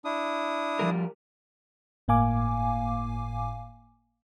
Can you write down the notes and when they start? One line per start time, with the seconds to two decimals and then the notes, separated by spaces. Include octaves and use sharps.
0.05 D4 E4 D#6
0.79 F3 G3 A#4
2.08 G1 A2 A#3 F5 G#5 D6